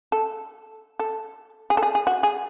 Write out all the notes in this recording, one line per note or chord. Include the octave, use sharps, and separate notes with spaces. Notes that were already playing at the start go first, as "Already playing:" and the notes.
A4
A4
G#4
A4
G#4
G#4
F#4
G#4